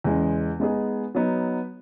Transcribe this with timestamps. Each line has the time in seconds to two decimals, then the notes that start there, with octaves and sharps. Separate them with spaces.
0.04 E2 C#3 G#3
0.60 G#3 B3 D#4 G#4
1.15 F#3 B3 D#4